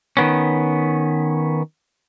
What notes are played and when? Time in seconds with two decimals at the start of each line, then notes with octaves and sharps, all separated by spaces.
0.17 D#3 B3 C#4